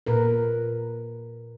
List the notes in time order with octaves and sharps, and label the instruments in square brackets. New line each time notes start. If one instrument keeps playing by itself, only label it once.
[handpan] A#2 A#4 B4